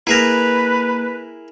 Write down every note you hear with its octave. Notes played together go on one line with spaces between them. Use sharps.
A#3 E4 G#4 A#4 B4